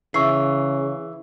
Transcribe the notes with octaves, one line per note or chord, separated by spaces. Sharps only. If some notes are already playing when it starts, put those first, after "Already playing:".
C#3 E3 C#6 C7